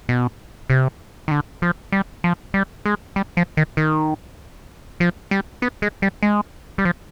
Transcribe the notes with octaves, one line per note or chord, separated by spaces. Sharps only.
B2
C3
D#3
D3
F3
G3
F3
G3
G#3
G3
F3
D#3
D#3
F3
G3
B3
G#3
G3
G#3
G3
F3